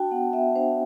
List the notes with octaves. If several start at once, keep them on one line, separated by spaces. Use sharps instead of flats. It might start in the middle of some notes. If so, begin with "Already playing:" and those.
Already playing: D4 F#4 G5 A5
B3 F#5
B3 E5
D4 C5